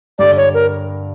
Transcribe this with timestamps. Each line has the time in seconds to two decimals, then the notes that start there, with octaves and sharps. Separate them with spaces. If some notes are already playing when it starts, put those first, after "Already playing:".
0.19 G2 D3 G3 D5
0.37 C#5
0.54 A#4